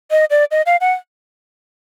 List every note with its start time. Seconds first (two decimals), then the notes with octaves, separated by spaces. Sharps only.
0.11 D#5
0.30 D5
0.51 D#5
0.66 F5
0.81 F#5